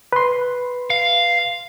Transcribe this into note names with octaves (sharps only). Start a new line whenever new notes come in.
B4 C6
F5